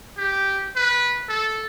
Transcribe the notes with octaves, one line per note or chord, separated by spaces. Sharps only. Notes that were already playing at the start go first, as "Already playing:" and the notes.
G4
B4
A4